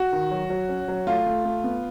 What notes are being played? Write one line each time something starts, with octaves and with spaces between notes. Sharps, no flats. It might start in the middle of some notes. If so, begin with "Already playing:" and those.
Already playing: F#4
D#3
F#3
F#3
C#4
F#3
A3 F4
A3
A3
B3